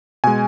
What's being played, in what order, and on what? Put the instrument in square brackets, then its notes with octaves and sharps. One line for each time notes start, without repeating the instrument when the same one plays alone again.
[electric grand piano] B2 G#3 G#5